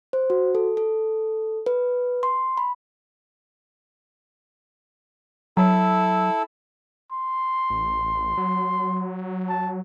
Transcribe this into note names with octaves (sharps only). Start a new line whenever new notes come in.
C5
F#4
A4
A4
B4
C6
B5
F#3 E4 A4
C6
A1
F#3
A5